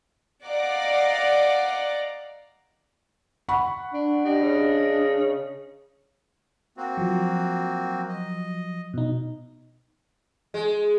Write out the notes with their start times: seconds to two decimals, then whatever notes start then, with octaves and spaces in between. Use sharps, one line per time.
0.45 D5 D#5 F5 F#5 A#5 D6
3.48 F#5 B5 C#6
3.93 D4
4.25 D4 G4 D#5
4.42 C#3
6.77 A#3 C4 F#4
6.97 F3 F#3
8.09 D#5
8.94 B2 D#4
10.54 G#3